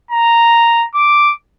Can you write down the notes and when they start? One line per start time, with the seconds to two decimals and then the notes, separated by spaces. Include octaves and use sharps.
0.11 A#5
0.95 D6